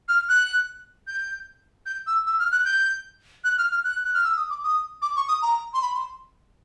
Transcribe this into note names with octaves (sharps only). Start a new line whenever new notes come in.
F6
F#6
G6
G6
E6
E6
F6
F#6
G6
F#6
F6
F6
F#6
F#6
F6
E6
D#6
D6
D#6
D6
C#6
D#6
A#5
C6
B5
C6